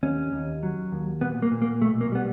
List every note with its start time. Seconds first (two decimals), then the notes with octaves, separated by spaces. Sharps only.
0.03 D#2 C#4
0.33 D#2
0.63 F#3
0.92 D#2
1.21 A#2 B3
1.42 A#3
1.51 A#2
1.62 A#3
1.82 B1 A3
2.01 A#3
2.12 G3 B3